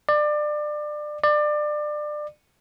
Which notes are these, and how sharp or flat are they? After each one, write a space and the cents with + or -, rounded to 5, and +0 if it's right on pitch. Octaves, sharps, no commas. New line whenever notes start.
D5 +25
D5 +25